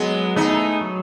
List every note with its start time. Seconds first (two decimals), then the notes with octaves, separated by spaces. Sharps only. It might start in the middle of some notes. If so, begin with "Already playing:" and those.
Already playing: F#3 G#3 B3
0.36 A3 B3 D#4 E4 G#4
0.81 F#3